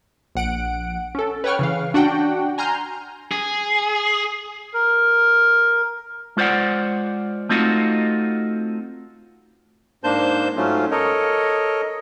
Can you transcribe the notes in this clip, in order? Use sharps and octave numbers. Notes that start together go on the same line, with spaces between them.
A#1 F#5 D7
C#4 A4
B4 C#5 F#5 G5 C#6 F6
C#3 E3 F5
D4 F#4 F#5 G5
G#5 A#5 C6 F6 G6
G#4
A#4
G#3 F4 C5 D5 F#5
A3 C4 D#4 F4 F#4
G#2 A#3 D4 C5 A5 G6
G#2 F#3 A3 C#4 F4
A4 A#4 C#5 D#5